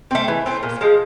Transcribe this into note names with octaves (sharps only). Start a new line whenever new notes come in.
A3 C4
E3
A3 C4
A#2
F3 G#3